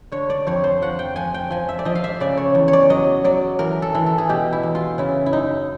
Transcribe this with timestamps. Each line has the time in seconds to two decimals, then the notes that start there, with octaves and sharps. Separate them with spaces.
0.12 D3 C#5
0.30 D5
0.47 F2 C#5
0.64 C5
0.82 F3 F#5
0.99 G5
1.16 F3 G#5
1.34 G5
1.51 F3 G#5
1.69 E5
1.79 D5
1.85 F3 D#5
1.95 F5
2.04 E5
2.20 C#3 D5
2.37 C#5
2.55 E2
2.68 C#5
2.73 D5
2.90 F#3 D#5
3.24 F#3 D5
3.59 E3 A#4
3.82 A4
3.95 E3
4.06 A4
4.18 G#4
4.29 B2 G4
4.52 E4
4.63 E2
4.75 F4
4.98 C#3 E4
5.26 E4
5.32 F#2 D#4